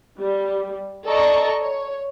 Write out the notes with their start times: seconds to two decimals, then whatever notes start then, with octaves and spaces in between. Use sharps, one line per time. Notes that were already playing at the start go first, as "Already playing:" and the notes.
0.19 G3
1.06 A4 D5 D#5 A5 A#5 C#6
1.61 C#5